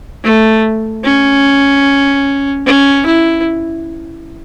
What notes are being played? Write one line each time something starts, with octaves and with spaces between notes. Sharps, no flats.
A3
C#4
C#4
E4